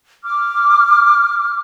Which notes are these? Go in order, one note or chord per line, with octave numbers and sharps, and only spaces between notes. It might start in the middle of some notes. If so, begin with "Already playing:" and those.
D6 F6